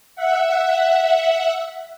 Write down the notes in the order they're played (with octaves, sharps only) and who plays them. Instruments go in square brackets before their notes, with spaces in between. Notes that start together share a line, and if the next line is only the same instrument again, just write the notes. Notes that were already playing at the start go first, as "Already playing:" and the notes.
[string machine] E5 F#5